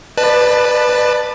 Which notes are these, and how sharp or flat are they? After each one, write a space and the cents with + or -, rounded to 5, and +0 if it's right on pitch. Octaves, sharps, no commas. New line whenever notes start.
B4 +0 D5 +35 A5 +0